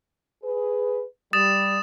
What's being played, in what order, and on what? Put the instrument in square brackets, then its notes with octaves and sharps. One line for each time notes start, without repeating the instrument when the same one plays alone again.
[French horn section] G#4 B4
[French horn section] G3 [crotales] D#6 A6 E7